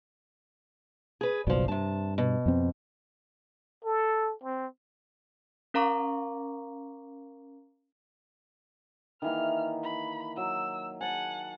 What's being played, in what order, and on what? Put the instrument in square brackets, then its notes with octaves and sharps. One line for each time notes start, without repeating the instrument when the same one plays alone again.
[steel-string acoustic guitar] G#4 B4
[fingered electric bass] F#1 B1 B2 [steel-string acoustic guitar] G2 F3
[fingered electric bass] G2 [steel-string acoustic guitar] C3 A5
[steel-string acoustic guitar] B2
[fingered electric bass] F2 C4
[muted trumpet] A4
C4
[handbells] C#4 A#4 F5 A#5 C#6 D6
[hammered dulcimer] D#3 E3 A#3 [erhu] F6
[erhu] B5
[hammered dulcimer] F#3 [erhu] E6
[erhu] F#5 [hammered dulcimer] G#5 A5